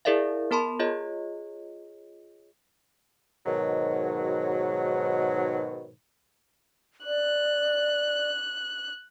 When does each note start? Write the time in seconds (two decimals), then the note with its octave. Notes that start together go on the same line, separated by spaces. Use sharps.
0.05 E4 G#4 A#4 D5 E5 F5
0.51 B3 A#4 A5 B5 C6
0.79 F4 G#4 C#5 D#5
3.46 G#2 B2 D#3 F#3
7.06 D5 F#6